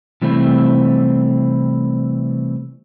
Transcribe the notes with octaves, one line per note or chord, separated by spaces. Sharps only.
C3 E3 G3 A3 C4 E4